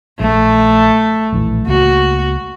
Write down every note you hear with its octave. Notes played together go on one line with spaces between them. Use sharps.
A#1 A3
A#1 A2 E3
C#2 A#3 F#4